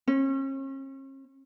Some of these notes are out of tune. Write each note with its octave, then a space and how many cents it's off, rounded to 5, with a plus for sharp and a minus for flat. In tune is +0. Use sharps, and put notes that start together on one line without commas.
C#4 -45